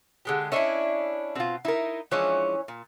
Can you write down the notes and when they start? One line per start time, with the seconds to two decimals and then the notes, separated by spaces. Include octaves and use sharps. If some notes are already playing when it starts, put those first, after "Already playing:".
0.25 D3 G#3 G4
0.52 C#4 D4 E4 C#5 D#5 E5
1.35 B2 C4 F4
1.65 D#4 E4 A#4
2.11 E3 F3 G#3 C#4 D4 C#5
2.68 A#2